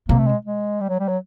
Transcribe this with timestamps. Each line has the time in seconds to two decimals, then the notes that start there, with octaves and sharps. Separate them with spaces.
0.09 C3 A#3
0.18 A3
0.27 G#3
0.45 G#3
0.80 G3
0.89 F#3
1.00 G3
1.08 F#3